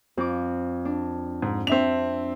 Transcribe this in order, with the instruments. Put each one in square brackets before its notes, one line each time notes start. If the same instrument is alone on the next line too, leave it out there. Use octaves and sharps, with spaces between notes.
[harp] F2 D6
D4
[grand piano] G#2
[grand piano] C4 E5 F7 [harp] D4